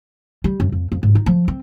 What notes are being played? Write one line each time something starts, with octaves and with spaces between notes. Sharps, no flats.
G3
F#2
F2
F2
G#2
D#4
F3
C4